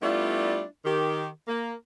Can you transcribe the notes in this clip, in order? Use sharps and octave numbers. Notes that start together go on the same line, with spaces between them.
G3 A3 B3 D4 E4 F4
D#3 G4
A#3